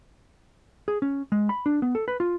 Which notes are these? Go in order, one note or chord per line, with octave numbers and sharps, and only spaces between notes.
G#4
C#4
G#3
B5
D4
B3
A4
B4
F4